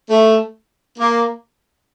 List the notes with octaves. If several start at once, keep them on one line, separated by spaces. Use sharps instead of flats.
A3
A#3